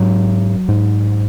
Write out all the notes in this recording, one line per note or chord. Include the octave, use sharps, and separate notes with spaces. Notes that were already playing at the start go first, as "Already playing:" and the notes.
Already playing: G#2 F#3
G#2